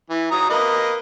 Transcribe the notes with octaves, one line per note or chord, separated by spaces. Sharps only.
E3
F#3 A#5 D#6
A#3 B4 D#5